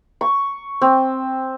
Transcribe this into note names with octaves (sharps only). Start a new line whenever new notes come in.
C#6
C4